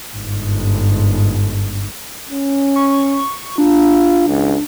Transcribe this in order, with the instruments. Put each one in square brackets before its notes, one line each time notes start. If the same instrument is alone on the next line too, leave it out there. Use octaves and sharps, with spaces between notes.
[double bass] G1 G#2
[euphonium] C#4
[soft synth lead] C#6
[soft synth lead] D4 [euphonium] F4
[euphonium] C#2